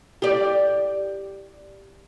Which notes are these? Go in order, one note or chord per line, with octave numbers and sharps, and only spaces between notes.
G4 D5